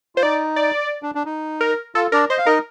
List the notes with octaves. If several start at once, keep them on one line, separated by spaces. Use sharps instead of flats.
F4 C5
D#4 D5
D5
D4
D4
D#4
A#4
F4 A4
D4 A#4 D5
C5 D#5
F5
D#4 A#4 D#5